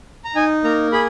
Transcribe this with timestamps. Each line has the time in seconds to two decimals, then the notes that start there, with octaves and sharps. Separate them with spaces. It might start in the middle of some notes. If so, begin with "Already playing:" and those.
0.25 A#5
0.35 D#4 G#5
0.64 A#3 A#5
0.92 G#4 B5